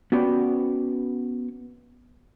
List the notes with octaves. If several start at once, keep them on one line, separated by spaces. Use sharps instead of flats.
B3 C#4 F#4 G4 C5 D5